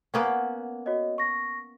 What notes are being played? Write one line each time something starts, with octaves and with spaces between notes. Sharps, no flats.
A#3 B3 C#4 F#5
F#4 C#5 D#5
C#6 A#6